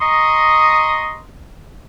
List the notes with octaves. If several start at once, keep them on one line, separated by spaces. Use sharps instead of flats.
D#5 A#5 C6 C#6 D#6